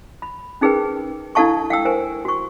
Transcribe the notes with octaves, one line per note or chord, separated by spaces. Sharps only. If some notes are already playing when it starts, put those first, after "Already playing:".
B5
C#4 D#4 G#4 A#4 B4 G5
D4 E4 A4 F5 A5 C#6
F5 G5 E6
A#4 C5 G#5
F#4 C#6